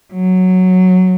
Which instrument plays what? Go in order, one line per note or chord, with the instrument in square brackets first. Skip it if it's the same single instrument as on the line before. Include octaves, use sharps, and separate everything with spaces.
[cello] F#3